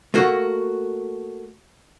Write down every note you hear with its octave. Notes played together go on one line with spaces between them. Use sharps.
A3 A#3 F#4